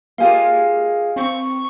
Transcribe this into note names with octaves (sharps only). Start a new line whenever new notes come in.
G#3 A#3 F4 G4 F5 G#5
C4 C#6